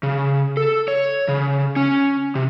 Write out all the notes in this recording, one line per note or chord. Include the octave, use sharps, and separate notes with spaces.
C#3
A4
C#5
C#3
C#4
C3